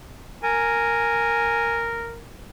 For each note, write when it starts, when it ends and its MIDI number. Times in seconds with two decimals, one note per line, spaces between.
0.44 2.22 70
0.44 1.89 80